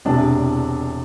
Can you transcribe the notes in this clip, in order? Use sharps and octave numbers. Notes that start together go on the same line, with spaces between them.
E1 E2 C3 E3 D4